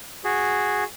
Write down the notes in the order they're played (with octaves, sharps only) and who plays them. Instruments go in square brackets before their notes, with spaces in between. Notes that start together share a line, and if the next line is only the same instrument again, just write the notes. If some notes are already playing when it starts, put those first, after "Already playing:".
[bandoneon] F#4 G#4